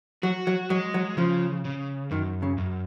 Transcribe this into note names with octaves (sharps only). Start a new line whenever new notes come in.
F#3 F#4
F#3
F#3 G#3
F#3
C#3 F3
C#3
F#2 D#3
C#3
F#2